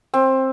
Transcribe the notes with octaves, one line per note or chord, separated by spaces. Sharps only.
C4